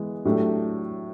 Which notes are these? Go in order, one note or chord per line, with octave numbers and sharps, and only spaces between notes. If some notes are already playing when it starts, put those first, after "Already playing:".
Already playing: E3 G#3 B3
A2 F#3 A3 D4 G4